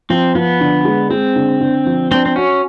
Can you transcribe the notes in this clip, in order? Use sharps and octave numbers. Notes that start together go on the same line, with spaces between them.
F3 C4
F3 B3
D3
G#3
G#3 C4
D3
D3
F3
C4 D4
C4
C#4 F#4